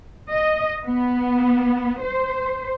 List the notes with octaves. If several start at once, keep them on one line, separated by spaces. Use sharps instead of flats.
D#5
B3
C5